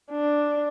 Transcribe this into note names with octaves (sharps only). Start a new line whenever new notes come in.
D4